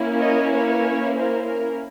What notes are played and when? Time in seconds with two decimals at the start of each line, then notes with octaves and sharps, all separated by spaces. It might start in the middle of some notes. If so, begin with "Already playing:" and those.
Already playing: A#3 C#4 E4
0.19 C#5 D#5
0.51 B4 C#5
1.14 A#4 C5
1.46 A#4